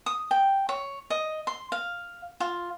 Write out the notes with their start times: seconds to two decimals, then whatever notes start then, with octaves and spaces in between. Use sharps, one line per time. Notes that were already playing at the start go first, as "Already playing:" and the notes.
0.06 D#6
0.31 G5
0.69 C#5
1.10 D#5
1.47 C6
1.72 F5
2.40 F4